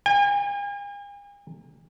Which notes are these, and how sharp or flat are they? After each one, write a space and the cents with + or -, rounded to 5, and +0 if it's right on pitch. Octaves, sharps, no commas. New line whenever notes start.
G#5 -45